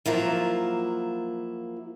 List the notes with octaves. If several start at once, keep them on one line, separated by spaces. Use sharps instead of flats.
F3 F#3 A#3 E4 F4